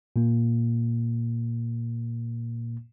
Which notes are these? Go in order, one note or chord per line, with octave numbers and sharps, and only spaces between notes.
A#2 A#3